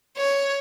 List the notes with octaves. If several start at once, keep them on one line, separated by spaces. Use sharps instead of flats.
C#5